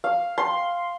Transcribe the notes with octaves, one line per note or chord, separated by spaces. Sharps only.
F5
C6